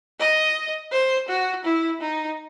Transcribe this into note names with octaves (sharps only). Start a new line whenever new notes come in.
D#5
C5
F#4
E4
D#4